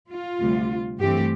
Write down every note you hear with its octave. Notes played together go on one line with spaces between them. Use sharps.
F4
D2 C3 G3
G2 E3 A3 C4 G4